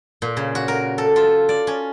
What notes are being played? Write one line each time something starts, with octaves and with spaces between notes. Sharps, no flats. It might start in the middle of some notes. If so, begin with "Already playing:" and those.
A#2
C#3
F#4
A#4
A4
F4
D5
C#4